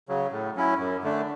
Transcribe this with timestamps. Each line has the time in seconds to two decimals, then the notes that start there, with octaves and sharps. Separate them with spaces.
0.09 C#3 F#3
0.32 A2
0.56 F#3 C#4 E4
0.78 F#2
1.03 D3 A3 D4